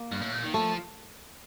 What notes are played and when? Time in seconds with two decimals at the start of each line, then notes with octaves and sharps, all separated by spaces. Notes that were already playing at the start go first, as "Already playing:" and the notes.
Already playing: A#3
0.12 G2
0.21 A2
0.32 A#2
0.43 D#3
0.54 F3 A3